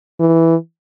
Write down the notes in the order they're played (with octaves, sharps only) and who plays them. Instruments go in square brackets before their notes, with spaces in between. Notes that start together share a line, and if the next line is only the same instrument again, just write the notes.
[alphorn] E3